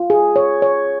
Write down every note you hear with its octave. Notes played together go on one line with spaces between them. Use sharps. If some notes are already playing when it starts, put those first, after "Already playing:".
Already playing: F4
G#4
C#5
C#5